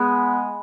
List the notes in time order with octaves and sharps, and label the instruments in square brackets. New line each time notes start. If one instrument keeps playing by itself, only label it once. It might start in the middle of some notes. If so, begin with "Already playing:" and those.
Already playing: [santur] G#3 B3